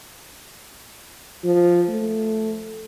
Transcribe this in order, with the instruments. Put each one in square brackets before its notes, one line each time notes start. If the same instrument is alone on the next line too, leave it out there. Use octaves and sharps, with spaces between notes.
[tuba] F3
A3